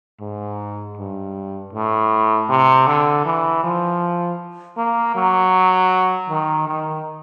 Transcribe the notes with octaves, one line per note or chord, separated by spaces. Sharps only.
G#2
G2
A2
C3
D3
E3
F3
A#3
F#3
D#3
D#3